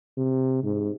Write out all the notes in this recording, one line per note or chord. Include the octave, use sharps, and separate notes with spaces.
C3
G#2